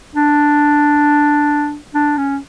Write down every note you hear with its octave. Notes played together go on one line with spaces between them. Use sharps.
D4
D4
C#4